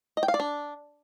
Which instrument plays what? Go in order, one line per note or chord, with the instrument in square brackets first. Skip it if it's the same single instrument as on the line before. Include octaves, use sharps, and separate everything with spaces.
[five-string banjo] D#5
G5
F5
D5
D4